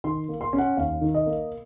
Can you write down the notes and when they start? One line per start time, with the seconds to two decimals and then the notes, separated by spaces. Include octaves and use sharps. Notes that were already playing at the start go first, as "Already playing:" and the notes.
0.04 D#3 C6
0.29 A#3
0.41 C6
0.53 C#4
0.58 F#5
0.77 D#2 F5
1.01 D#3
1.14 D#5
1.26 A#3